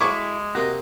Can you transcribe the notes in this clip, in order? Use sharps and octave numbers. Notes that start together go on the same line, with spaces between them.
G#3 E4 F#4 G#4 A4 C#6 D6
C3 A#3 C4 F#4 D#5